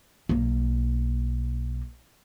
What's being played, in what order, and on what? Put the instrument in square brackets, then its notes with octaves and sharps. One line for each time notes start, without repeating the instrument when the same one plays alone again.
[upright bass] B1 A#3